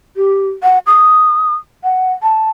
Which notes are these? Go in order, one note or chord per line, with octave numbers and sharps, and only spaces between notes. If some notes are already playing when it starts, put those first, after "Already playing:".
G4
F#5
D#6
F#5
A5